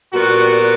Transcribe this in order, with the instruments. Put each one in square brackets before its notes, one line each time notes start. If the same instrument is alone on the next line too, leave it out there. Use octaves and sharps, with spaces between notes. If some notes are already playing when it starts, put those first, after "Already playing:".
[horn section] A#2 G3 B3 F#4